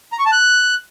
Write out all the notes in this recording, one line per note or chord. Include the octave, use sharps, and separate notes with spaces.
A#5
C#6
A5
F#6